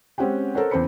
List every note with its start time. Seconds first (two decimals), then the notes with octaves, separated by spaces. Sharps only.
0.18 G#3 C4 C#4 G4 F#5 G5
0.55 A4 A#4 C5 C#5 F#5
0.71 E2 C#3 C4 C5 B5 C#7